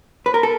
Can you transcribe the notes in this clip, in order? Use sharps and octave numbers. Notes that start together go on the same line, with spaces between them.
B4
A#4
A4